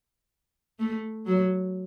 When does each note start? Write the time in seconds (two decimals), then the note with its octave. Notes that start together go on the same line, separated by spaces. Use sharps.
0.79 A3
1.26 F#3